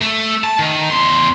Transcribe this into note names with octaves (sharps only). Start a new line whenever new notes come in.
A3
A5
D#3
E2 C6